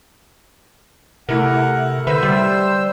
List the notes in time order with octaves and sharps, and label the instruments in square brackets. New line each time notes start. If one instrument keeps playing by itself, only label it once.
[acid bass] C3 [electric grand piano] A3 E4 A#4 [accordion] F#5
[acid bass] D3 [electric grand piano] B4 E5 [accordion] C5 E6
[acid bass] G3 [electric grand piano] G4